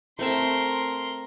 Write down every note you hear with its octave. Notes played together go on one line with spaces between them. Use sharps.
A3 C4 A#4 E5 C6